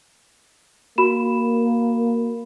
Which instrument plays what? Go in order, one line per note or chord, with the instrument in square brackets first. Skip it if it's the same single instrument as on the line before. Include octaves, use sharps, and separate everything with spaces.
[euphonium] A#3 [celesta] F#4 B5 E7